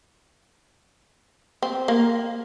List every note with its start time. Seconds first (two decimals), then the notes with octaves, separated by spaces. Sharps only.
1.62 C4
1.88 A#3